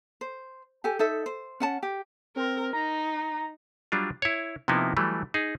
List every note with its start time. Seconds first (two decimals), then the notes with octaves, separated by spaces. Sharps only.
0.21 C5
0.84 G4 A4 G#5
0.99 D#4 A4 E5
1.26 C5
1.60 C#4 F#5 A5
1.83 G4
2.36 C4 A#4
2.73 D#4 A#5
3.92 F#3 G3 D4 F4
4.22 E4 C#5
4.68 C3 F3 A#3 B3 D#4 E4
4.97 E3 F#3 G3 A3
5.34 D#4 G#4